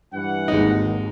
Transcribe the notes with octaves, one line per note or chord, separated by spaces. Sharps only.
G2 E3 F#5
G#1 D#2 G#3 D#4